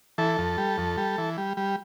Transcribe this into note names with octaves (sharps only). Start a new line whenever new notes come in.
E3 A4
F2
G3
F2
G3
E3
G3
G3